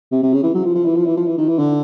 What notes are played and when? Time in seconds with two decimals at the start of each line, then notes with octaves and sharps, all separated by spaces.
0.12 C3
0.23 C3
0.33 C#3
0.44 E3
0.54 F#3
0.64 F3
0.75 F3
0.86 E3
0.96 F3
1.06 E3
1.17 F3
1.27 E3
1.38 D#3
1.48 E3
1.59 D3